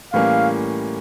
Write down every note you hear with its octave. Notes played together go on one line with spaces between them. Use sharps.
A2 E3 G3 A#3 C#4 F5